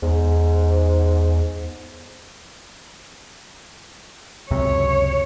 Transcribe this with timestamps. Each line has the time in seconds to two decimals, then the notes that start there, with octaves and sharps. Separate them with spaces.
0.02 E2 G#2
4.51 C#2 F#2 C3 C#5